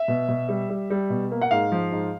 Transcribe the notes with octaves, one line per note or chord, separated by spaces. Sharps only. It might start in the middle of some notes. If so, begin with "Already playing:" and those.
Already playing: E5
B2
B2
G3
G3
G3
B2
A#3
F#5
G#2 F5
F3
G#2